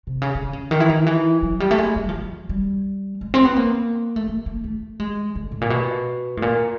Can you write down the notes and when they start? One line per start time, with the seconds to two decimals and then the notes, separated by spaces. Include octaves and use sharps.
0.07 C3
0.22 C#3
0.35 D3
0.53 C#3
0.71 D#3
0.80 E3
0.89 D#3
1.07 E3
1.43 F#3
1.60 G3
1.71 A3
1.78 G#3
1.96 G3
2.09 F3
2.14 F#3
2.49 G3
3.21 G#3
3.34 C4
3.45 B3
3.57 A#3
4.16 A3
4.28 A#3
4.46 A#3
4.64 A3
5.00 G#3
5.35 D3
5.52 A2
5.61 A#2
5.70 B2
6.37 A2
6.42 A#2